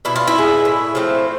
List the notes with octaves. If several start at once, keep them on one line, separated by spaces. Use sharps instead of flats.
B2 E4
F4
E4
G#3 B3
A2
F3 A3 C4